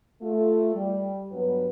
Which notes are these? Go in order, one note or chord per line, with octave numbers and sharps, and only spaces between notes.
A3 F4
G3
G2 F#3 B3 B4